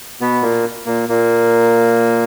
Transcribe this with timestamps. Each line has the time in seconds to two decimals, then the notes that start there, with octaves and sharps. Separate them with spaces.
0.21 B2 B3
0.42 A#2 A#3
0.86 A#2 A#3
1.09 A#2 A#3